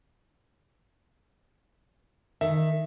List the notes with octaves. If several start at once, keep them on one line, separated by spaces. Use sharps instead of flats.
D#3 E5